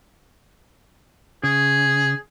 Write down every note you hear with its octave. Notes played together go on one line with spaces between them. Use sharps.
C#3 G#4